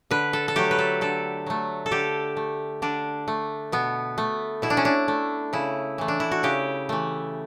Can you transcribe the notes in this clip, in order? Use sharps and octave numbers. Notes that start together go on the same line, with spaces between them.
D3 B4
A4
A4
F#3 A3 G4
B4
A4
D3 A4
F#3 A3
A4
D3 G4
A3
D3 D4
A3
B2 B3
A3
B2 E4
D4
C#4
D4
A3
C#3 E4
E3 A3
D4
E4
F#4
C#3 G4
E3 A3